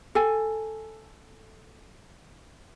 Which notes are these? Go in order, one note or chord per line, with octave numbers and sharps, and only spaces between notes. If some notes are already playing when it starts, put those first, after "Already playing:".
A4 G#5